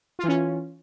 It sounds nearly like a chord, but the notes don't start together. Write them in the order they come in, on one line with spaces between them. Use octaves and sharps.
F4 E3 C#4